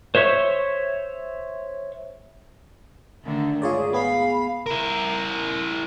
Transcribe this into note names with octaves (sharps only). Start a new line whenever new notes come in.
C5 C#5 E5 C#6
D3 D#3 A3
G#2 F4 G#4 C#5 D5
B3 G#4 F5 B5
E4 A#4